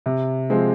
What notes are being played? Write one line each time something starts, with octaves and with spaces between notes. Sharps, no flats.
C3
F3 G#3 C4